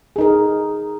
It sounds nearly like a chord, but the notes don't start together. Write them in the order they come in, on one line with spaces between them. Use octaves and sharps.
G#4 D#4 A#4